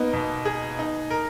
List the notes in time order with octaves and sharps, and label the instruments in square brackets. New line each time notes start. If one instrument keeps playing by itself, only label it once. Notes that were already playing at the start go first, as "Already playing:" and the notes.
Already playing: [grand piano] A#3 D#4 [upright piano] B3
[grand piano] B2
G#4
D#4
A#4